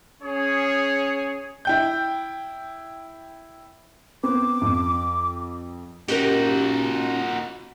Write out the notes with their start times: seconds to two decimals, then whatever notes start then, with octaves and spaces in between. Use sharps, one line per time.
0.22 C#4 G#4 C#5
1.65 E4 G5 G6
4.23 B3 C4 D6
4.61 F2
6.08 A#2 C#4 D#4 F#4 G4 A#4